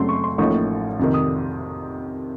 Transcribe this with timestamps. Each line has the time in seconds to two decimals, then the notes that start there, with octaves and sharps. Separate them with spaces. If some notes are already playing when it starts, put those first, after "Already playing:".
Already playing: F#2 C#3 F#3 A3 C4 C6
0.09 C#6
0.24 C6
0.38 A1 A2 F3 A#3 D#4 C#6
0.99 F2 C3 D#3
1.14 D#6